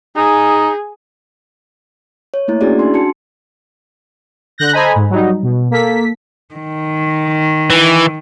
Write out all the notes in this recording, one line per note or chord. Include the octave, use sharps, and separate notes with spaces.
D#4 G#4
C#5
A3 A#3 E4
C#4 D4 E4 F#4 G#4 D5
D4 F#4 C6
F#4 A5 C#7
D3 F#6 G6 A#6
A4 C5 D#5 G#5 A#5 B5
G#2
F#3 G3 D#4
B2
A#3 A4 B6
D#3
E3